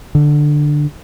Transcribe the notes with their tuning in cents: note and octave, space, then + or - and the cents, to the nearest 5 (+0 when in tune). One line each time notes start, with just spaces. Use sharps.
D3 +10